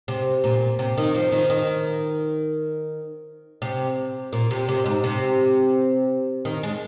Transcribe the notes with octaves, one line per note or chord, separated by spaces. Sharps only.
C3
A#2
C3
D#3
F3
D#3
D#3
C3
A#2
C3
C3
G#2
C3
D#3
G#3